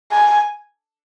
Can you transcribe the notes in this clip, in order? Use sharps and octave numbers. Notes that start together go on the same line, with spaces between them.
G#5